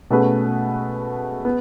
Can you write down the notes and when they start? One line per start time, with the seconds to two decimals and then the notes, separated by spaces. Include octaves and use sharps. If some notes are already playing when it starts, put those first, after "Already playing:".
0.10 B2 A3 C#4 G#4 B4
1.45 B3